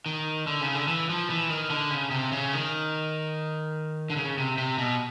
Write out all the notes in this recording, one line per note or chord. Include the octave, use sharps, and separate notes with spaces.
D#3
D3
C#3
D3
E3
F3
E3
D#3
D3
C#3
C3
C#3
D#3
D3
C#3
C3
C3
B2